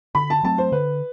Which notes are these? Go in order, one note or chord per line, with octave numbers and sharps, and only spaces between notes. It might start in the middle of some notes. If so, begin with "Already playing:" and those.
D3 B5
A5
F#3 A3 C4 A5
C5
D3 B4